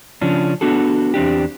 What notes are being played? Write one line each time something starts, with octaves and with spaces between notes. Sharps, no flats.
C#3 F3 C#4 D4
B3 D4 F#4 A4
E2 C4 D4 G4